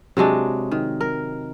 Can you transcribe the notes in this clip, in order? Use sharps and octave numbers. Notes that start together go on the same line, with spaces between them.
C3 F#3 G#3 D4
D#3
A#4